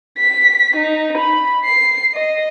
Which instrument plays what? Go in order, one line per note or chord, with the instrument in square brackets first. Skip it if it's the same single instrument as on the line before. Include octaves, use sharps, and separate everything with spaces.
[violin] B6
D#4
B5
C7
D#5